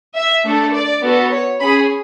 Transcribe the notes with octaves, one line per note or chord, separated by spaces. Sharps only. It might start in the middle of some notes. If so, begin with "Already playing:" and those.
E5
A3 D4 A4
D5
B3 F#4 A4
C#5
C#4 G#4 B5